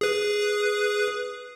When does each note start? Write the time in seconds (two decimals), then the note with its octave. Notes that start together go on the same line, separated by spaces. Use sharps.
0.01 G#4 B4